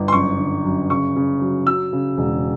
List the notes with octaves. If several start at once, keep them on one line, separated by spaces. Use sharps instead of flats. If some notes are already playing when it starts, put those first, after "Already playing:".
Already playing: G1
C6
F#1 C#6
D3
F#2
C#3 C#6
C#3
F#3
F#3 E6
C#3
E1